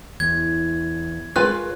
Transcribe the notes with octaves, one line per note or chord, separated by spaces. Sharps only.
E2 G#6
G#3 F4 A#4 B4 C#5 G#5 F#6